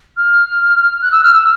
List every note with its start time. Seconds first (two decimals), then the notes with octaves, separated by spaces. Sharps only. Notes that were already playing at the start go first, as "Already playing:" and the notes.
0.17 F6
1.02 F#6
1.12 E6
1.24 F6
1.34 E6